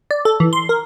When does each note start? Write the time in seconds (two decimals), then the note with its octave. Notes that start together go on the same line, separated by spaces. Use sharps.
0.11 D5
0.25 A4
0.40 E3
0.53 C6
0.69 A#4